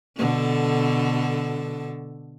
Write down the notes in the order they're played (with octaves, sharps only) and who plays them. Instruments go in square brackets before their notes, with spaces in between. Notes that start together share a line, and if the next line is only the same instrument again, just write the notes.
[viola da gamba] B2 D3 A4